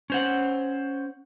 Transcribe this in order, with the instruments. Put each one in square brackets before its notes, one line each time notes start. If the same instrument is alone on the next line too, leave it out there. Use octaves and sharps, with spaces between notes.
[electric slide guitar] C#4 C5 F#5